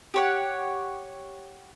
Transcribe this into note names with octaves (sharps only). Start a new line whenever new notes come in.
G4 C#5 F#5